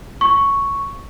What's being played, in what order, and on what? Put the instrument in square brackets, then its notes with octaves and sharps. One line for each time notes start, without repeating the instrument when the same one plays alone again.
[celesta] C#6